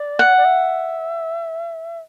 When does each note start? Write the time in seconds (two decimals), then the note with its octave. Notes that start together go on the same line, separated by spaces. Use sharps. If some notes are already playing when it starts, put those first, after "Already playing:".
Already playing: D5
0.19 F#5
0.37 D5
0.45 E5